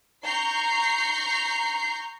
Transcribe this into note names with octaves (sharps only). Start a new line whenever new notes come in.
A#5 C#6 G6 C7